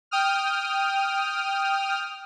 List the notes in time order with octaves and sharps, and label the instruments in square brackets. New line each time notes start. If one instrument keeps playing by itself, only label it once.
[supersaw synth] G5 D#6 F6